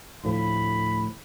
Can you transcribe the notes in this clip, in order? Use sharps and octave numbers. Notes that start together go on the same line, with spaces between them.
D2 A2 F3 B5